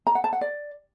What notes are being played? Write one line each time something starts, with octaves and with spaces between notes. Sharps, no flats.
A#5
F#5
A5
F#5
D5